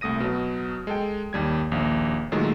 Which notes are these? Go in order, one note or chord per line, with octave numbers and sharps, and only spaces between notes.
C2 A3 D#6 A#6 D#7
B2 F#3
G#3 A4 G5
D#2 G3 G#6
A#1 D#2
A#2 D#3 F#3 G#3 A3